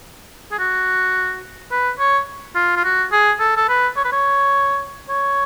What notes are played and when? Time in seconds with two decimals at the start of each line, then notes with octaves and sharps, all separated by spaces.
0.52 G#4
0.59 F#4
1.71 B4
1.99 C#5
2.55 F4
2.77 F4
2.84 F#4
3.12 G#4
3.40 A4
3.57 A4
3.69 B4
3.97 C#5
4.05 B4
4.12 C#5
5.09 C#5